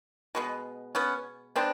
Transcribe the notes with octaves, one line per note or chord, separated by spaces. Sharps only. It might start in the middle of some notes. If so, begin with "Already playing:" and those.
B2 G#3 B3
B3 C#4
G#3 B3 C4 D4